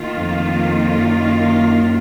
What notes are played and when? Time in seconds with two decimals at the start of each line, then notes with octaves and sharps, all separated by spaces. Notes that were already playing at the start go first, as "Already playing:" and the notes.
Already playing: D#3 A#3 F4
0.17 F2
0.94 F#2